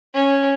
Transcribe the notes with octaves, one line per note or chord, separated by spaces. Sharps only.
C#4